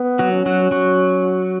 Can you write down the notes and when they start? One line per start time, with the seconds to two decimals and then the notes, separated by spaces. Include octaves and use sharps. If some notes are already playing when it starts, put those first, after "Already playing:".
Already playing: B3
0.19 F#3 F#4
0.33 C#4
0.46 F#3 F#4
0.71 F#3 F#4